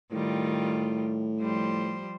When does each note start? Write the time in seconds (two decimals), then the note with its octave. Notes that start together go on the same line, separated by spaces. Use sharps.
0.12 A2 D#3 G3 F4
1.41 F3 G3 C5